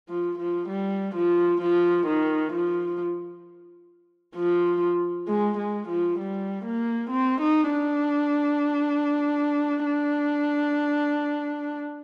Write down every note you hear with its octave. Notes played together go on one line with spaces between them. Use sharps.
F3
F3
G3
F3
F3
D#3
F3
F3
G#3
G#3
F3
G3
A#3
C4
D#4
D4
D4